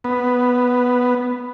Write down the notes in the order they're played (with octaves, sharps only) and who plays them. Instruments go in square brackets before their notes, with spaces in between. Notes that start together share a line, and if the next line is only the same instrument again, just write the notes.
[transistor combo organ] B3